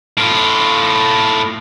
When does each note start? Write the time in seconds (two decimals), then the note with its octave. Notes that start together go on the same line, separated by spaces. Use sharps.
0.17 A2 F4